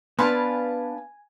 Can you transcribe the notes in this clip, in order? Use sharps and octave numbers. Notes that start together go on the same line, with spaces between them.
B3 D4 B4 F5 G#5 A5 C6